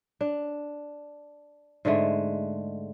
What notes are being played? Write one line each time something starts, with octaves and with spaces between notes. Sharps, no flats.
D4
G#2 D3 G#3 A3